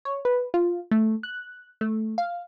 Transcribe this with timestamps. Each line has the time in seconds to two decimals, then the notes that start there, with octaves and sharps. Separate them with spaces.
0.05 C#5
0.25 B4
0.54 F4
0.91 A3
1.23 F#6
1.81 A3
2.18 F5